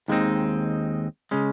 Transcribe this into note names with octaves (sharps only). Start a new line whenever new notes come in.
D#2 D#3 G#3 C4 D#4
C#3 G#3 C#4